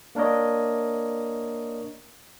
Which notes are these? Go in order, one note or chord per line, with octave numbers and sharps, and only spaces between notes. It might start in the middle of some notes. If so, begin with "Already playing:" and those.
A#3 D4 A#4 C#5 D#5